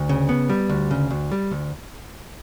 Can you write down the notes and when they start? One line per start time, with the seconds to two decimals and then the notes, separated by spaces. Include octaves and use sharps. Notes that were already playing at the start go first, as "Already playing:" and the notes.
Already playing: D2
0.09 C#3
0.29 B3
0.49 G3
0.69 D2
0.91 C#3
1.11 D2
1.32 G3
1.51 D2